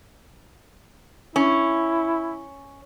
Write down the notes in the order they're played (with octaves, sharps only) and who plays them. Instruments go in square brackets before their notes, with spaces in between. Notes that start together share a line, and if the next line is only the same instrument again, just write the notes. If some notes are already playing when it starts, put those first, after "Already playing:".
[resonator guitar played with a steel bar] C#4 [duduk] E4